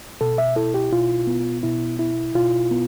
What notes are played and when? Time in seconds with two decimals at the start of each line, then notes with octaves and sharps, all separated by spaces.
0.21 B2 A4
0.38 E5
0.56 E4 A4
0.74 G4
0.92 B2 F4
1.27 B3
1.63 B2 E4
1.99 E4
2.35 B2 F4
2.71 B3